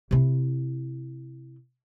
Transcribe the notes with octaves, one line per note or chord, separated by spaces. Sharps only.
C3 E4